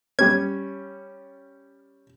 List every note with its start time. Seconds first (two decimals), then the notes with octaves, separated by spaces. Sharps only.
0.19 G3 C#4 G#6